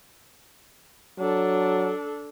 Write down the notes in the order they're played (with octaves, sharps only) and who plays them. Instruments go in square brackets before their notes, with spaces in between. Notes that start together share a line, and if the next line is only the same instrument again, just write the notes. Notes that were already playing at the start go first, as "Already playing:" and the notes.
[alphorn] F#3 [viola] D4 A4